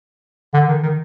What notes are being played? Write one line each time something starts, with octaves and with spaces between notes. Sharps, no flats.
D3
D#3
D#3